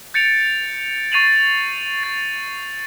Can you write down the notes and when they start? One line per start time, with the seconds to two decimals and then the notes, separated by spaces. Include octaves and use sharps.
0.14 G6 A6 C#7 D7 F7
1.12 C#6 A6 C7 D#7 F7 F#7
2.03 A6